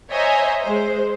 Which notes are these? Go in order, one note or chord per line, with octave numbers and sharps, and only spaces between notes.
C5 C#5 D#5 E5 G#5 A#5
G#3 C5